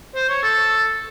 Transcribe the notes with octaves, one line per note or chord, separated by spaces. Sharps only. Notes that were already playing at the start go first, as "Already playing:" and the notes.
C5
C#5
A4